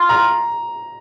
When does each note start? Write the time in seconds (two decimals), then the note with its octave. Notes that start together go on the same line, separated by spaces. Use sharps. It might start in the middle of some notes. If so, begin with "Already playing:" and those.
Already playing: F4
0.09 A#5